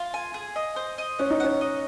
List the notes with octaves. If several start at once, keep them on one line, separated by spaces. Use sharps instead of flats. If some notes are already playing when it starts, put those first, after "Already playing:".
Already playing: F4
G#5
G#4
D#5
C5
D#5
C#4 F#5
D#4
C#4 F#5
D#5